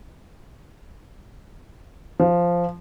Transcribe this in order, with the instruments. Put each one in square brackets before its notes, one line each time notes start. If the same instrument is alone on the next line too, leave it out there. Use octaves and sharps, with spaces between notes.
[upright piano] F3